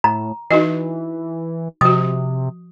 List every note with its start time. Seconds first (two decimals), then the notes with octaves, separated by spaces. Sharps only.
0.04 A2 A#5
0.51 E3 D#4 F#4 D#5
1.81 C3 F3 F#4 D#6